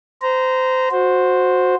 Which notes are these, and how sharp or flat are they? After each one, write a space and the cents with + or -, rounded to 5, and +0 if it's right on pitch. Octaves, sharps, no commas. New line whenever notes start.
C5 -25 A#5 +0
F#4 -15 C5 +0